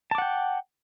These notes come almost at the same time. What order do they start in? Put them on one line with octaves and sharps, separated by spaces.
A5 D6 F#5 G5